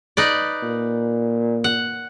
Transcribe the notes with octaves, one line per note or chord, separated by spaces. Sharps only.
D#4 B4 D5
A#2
F#5